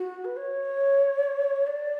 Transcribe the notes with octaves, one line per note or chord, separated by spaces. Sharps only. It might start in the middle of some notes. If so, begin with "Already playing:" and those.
Already playing: F#4
B4
C#5
D5